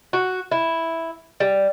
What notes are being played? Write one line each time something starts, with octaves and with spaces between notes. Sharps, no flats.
F#4
E4
G3